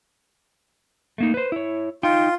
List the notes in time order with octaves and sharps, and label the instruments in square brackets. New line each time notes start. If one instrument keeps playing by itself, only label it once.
[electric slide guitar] A3 A#3 D#4
B4 C5
E4 C#5
[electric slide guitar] D#4 G5 [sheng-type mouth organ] F4